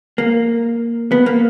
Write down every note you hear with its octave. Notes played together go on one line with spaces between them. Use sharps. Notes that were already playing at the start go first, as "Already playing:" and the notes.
A#3
B3
A#3